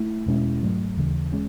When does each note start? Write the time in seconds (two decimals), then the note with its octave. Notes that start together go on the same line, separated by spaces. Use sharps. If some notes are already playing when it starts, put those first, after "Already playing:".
Already playing: A3 E4
0.26 E2 B2 G#3 C#4 E4
0.61 G#2 F#3 A3
0.96 D#2 C#3 E3
1.32 G#3 C#4